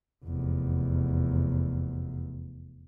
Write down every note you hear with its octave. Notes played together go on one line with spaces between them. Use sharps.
F1 E2